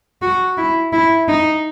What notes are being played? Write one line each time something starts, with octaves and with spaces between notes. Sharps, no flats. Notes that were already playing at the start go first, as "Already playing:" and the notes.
F#4
E4
E4
D#4